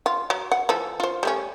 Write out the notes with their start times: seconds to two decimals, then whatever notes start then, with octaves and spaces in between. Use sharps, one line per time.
0.06 F4
0.30 F#3
0.52 F#5
0.69 E3 F3 A4
1.00 F4 C5
1.23 G3 A3 C#4